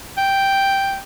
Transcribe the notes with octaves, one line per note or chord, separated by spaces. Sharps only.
G5